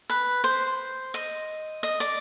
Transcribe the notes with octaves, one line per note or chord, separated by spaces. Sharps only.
B4
C5
D#5
D#5
D5